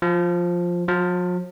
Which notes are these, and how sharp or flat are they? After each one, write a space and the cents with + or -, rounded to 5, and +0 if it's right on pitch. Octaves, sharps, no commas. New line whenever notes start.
F3 +5
F3 +45